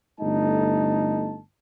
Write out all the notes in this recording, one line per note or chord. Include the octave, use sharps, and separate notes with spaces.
G1 A3 D#4 A5